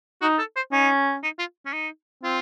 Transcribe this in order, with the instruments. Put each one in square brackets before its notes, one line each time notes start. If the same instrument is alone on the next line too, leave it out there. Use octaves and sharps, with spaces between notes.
[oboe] D#4 [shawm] F#4
[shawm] A4
C5
[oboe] C#4 [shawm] D#4
[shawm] D#4
F4
C#4
D#4
[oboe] C4 [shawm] F4